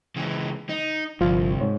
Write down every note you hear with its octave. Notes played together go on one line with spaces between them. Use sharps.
C#2 E3
D#4
G1 C2 F3 F4
G#2 C#5